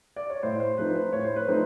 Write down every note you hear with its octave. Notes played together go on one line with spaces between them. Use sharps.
D5
C#5
A2 C5
C5
F3 A3 C4 D#4 B4
C5
A2 C#5
C5
B4
F3 A3 C4 D#4 C5